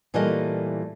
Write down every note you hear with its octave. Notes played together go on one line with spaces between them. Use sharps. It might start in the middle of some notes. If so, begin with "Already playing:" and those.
A#2 E3 G3 A3 A#4 D#5